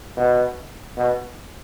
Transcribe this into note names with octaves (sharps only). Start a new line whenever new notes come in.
B2
B2